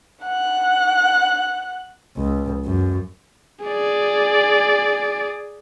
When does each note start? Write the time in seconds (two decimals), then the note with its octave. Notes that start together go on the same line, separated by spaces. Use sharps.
0.25 F#5 F#6
2.17 C#2
2.65 F#2
3.64 G#4 D5